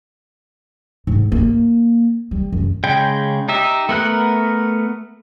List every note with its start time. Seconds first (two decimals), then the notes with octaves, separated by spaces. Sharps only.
1.07 G#2
1.32 A#3
2.31 G3
2.52 F#2
2.84 C#3 G#3 G5
3.49 D#4 G4 E5
3.89 A3 B3 A#4 F#6